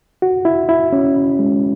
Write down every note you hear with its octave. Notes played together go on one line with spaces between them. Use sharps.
F#4
E4
E4
C#4
G#3